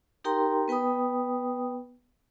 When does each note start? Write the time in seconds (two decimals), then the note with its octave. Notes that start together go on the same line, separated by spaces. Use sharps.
0.24 D#4 G4 A#4 G5 A#5 C6
0.68 B3 B4 G5 B5 D#6